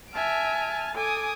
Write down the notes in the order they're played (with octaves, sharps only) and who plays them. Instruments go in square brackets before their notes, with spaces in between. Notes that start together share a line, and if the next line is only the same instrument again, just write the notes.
[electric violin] E5 D7 [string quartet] G#5 A5 F6
[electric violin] A4 [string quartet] G#5 D6 D#6